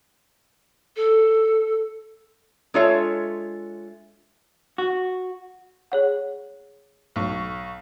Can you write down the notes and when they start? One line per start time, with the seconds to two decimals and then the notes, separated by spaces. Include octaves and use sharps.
0.96 A4
2.74 G#3 D4 F4 A4 C#5 E5
4.78 F#4
5.92 G#4 C#5 F#5
7.16 B1 C#6